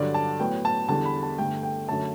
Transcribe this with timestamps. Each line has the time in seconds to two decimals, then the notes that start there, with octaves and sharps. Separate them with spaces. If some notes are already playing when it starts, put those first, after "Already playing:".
Already playing: G2 D3 F#3 D5
0.14 A5
0.40 A2 F#3 B3 G5
0.65 A5
0.89 E2 D3 G3 A5
1.05 B5
1.23 A5
1.38 G2 D3 A3 G5
1.63 G5
1.88 F#2 D3 F#3 A3 A5